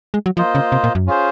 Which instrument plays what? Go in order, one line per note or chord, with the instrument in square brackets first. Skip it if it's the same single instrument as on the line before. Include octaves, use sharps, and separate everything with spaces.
[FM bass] G#3
F#3
[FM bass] F3 [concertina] A#3 F4 C5 D#5
[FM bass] C#3
C3
A#2
F#2
[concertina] C#4 F4 G#4 C5